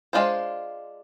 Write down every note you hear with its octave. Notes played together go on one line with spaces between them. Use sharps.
G#3 D4 F4 C5